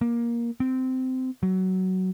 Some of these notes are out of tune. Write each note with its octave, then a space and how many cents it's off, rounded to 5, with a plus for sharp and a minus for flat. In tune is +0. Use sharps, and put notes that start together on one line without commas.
A#3 +15
C4 -20
F#3 +15